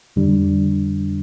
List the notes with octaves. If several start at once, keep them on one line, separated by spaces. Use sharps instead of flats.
F2 D3 G3 D4